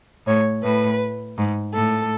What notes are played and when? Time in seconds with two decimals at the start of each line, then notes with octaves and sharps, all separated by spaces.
0.27 A2 C#5
0.63 A2 B4
1.38 G#2
1.74 A2 A4